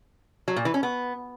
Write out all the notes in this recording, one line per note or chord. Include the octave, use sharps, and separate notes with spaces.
F#3
A#2
E3
C#4
B3